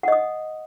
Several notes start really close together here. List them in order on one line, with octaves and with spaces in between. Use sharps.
F#5 D#5 D#6